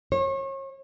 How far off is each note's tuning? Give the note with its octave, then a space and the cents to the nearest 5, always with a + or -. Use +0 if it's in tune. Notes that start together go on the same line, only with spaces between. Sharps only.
C#5 -35